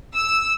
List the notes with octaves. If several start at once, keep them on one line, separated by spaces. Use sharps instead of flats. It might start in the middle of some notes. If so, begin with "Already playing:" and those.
E6